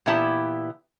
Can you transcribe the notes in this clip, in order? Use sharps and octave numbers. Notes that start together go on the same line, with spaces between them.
A#2 E3 B3 E4 G4 A5